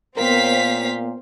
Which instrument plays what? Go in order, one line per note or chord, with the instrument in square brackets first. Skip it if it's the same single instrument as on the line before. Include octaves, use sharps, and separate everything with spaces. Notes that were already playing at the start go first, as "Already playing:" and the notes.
[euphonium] A#2 [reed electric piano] B3 A#4 [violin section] C4 C#5 B6 [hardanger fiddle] C5 F5